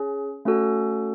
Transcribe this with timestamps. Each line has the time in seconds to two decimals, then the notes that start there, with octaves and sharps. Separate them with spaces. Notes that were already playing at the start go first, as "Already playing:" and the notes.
Already playing: C#4 G#4
0.45 A3 C#4 F#4 A4